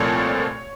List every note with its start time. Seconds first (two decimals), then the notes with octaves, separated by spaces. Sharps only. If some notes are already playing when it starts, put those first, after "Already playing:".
Already playing: C2 A#2 F3 A3 C4 C#5